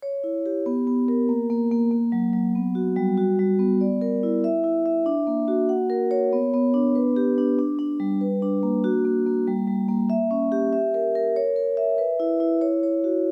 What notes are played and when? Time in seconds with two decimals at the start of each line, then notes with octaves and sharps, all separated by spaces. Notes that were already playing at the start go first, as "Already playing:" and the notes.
0.02 C#5
0.24 E4
0.46 G4
0.66 B3
0.87 B3
1.08 A#4
1.29 A#3
1.50 A#3
1.71 A#3
1.91 A#3
2.12 F#3
2.33 F#3
2.55 B3
2.75 F#4
2.96 G3
3.18 F#4
3.39 G3
3.59 B3
3.81 D5
4.01 A#4
4.23 E4
4.44 E5
4.64 E4
4.86 E5
5.06 D4
5.27 A#3
5.48 F#4
5.69 F#5
5.90 A#4
6.11 C#5
6.32 B3
6.54 B3
6.74 D4
6.95 B4
7.16 G4
7.38 D4
7.59 D4
7.79 D4
8.00 G3
8.21 B4
8.42 D4
8.63 A#3
8.84 F#4
9.05 A#3
9.26 A#3
9.48 G3
9.67 G3
9.89 A#3
10.10 E5
10.31 C#4
10.52 G4
10.73 E5
10.94 A#4
11.15 A#4
11.36 C#5
11.56 A#4
11.77 E5
11.98 B4
12.20 E4
12.40 E4
12.61 C#5
12.83 C#5
13.04 F#4